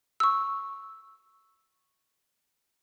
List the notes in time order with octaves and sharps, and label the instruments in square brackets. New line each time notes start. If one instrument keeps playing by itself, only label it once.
[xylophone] C#6 E6